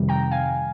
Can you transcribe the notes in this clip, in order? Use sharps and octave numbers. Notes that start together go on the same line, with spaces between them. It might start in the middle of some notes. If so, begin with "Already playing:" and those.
Already playing: F2 C3 D#3 G3
G5 A#5
F5 G#5